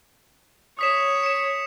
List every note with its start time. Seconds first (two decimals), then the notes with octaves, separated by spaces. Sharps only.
0.79 C#5 D#6 B6 E7
1.23 C#7 E7